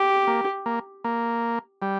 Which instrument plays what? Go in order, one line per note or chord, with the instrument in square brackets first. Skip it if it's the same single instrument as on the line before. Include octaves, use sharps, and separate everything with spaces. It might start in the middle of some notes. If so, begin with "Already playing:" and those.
Already playing: [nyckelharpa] G4
[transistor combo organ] A#3
A#3
A#3
G3